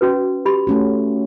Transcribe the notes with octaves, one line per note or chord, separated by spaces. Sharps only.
C#4 F#4 B4
G4 B5 C6
A3 C#4 F#4